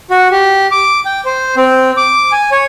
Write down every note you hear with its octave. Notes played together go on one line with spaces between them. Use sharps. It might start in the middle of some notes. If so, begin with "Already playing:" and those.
F#4
G4
D6
G5
C5
C4
D6
G#5
C#5